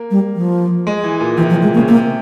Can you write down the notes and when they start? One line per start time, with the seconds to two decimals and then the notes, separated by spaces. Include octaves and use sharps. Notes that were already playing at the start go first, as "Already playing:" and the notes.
Already playing: A#3
0.11 G3
0.36 F3
0.87 G#3
1.04 E3
1.20 A#2
1.37 C3 E3
1.50 F3
1.63 G#3
1.75 C#3 A#3
1.88 C3 A#3